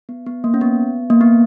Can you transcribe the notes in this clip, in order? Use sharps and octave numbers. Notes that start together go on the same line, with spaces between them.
B3
B3
A#3
C#4
B3
A#3
B3